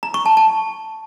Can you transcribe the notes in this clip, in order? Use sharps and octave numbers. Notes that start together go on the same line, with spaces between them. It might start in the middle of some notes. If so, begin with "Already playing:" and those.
A#5
C#6
A5
A5